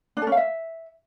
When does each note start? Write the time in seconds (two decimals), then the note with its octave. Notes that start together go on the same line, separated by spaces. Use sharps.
0.17 D4
0.22 A4
0.27 C#4
0.32 F5
0.37 E5